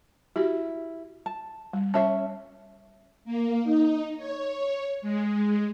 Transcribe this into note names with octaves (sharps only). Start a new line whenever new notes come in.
E4 F#4 G4
A5
G3
C#4 C#5 E5 A5
A#3
D#4
C#5
G#3